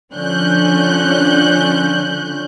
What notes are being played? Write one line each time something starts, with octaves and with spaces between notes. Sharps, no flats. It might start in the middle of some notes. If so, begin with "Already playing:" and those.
D3 F3 C#4 F#6 G6